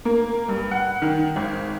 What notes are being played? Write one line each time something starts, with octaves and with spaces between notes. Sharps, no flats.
A#3
G2
F#5
D#3
G#1